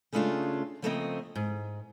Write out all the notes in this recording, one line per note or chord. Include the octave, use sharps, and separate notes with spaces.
C#3 G#3 A3 C#4 D4 F4
C#3 F3 A3 A#3 C4 D#5
G#2